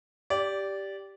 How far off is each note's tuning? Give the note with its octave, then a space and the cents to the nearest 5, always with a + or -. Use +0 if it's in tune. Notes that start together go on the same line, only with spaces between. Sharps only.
G4 +0 D5 -15